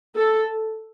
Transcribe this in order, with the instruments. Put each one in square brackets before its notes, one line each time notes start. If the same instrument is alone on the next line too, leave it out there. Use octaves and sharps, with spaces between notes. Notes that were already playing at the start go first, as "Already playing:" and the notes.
[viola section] A4